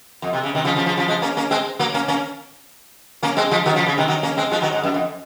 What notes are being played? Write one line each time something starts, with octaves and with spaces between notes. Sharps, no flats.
F2
C3
C#3
C3 D#3
C#3 F3
C#3 F3
C#3 F3
C#3 F3
F3 G#3
A#3 C#4
A#3 C#4
G#3 C4
F#3 A#3
A#3 C#4
A#3 C#4
A#3 C#4
G#3 C4
F3 G#3
D#3 F#3
C#3 F3
C#3
C3 D#3
D#3 F#3
A#3 C#4
G#3 C4
F3 G#3
D#3 F#3
G#2
F#2
F2